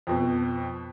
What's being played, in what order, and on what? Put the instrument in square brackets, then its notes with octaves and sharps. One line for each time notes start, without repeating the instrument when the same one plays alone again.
[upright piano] F2 B2